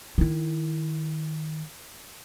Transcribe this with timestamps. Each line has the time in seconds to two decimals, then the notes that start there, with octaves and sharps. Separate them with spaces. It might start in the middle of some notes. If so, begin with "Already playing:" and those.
0.18 D#3 E4